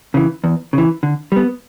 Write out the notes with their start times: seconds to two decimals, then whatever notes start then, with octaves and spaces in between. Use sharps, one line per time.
0.14 C#3 E3
0.44 E2
0.73 C#3 E3
1.03 D3
1.32 G3 B3